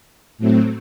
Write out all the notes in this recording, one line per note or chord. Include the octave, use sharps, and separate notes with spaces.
A2 F#3 A3 C4